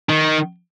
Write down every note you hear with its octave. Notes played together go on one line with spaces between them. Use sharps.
D#3